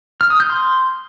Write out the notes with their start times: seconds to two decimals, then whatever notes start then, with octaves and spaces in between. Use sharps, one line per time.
0.21 F6
0.30 D#6
0.40 G6
0.50 C6